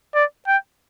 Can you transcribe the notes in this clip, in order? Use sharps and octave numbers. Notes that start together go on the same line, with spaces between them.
D5
G5